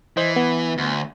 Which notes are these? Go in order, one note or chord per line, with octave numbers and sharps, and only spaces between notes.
E3 C5 D#5
B3
D2